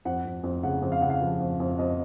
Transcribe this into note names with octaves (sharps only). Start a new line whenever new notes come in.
F2 F#5
F2
F2
C#3 F#5
F2
F5
C#3 F#5
F5
F3
F2
F2
F2 D#5